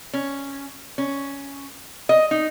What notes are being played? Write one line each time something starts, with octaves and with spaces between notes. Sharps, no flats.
C#4
C#4
D#5
D#4